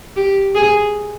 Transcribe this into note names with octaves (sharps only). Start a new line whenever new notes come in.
G4
G#4